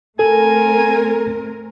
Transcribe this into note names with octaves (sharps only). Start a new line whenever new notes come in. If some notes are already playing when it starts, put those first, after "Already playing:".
A3 C4 A4 A#4 G#5